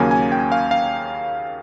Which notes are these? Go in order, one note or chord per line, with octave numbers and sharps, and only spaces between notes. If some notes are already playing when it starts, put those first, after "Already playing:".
Already playing: D#2 C#3 F#3 A#3 C#4 G#5
G#5
G5
F5
F5